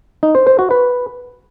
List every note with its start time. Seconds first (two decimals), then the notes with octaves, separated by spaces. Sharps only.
0.23 D#4
0.35 C5
0.47 C5
0.59 F#4
0.71 B4